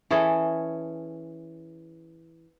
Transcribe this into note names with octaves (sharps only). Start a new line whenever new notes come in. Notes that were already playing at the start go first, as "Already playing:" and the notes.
E3 C#4 G#4 A4